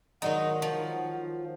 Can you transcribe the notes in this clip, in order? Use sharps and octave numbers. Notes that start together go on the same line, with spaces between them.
D#3 F#3 G#3 D#4 F#5
F3